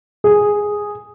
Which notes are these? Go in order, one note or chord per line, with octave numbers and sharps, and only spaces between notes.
G#4